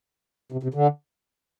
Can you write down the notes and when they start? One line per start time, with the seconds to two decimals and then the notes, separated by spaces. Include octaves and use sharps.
0.52 C3
0.63 C3
0.74 D3